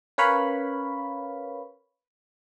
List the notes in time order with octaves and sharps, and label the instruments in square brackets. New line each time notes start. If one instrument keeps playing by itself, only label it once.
[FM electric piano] C#4 A#4 B4 C#5 F5 B5